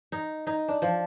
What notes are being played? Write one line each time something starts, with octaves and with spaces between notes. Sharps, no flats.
D#4
D#4
D4
F3